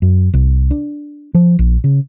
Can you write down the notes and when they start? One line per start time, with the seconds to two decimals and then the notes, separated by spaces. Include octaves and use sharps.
0.02 F#2
0.34 C2
0.71 D4
1.34 F3
1.59 A#1
1.84 C#3